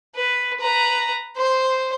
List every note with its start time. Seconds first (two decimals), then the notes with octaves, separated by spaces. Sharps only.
0.15 B4
0.60 B4 A#5
1.37 C5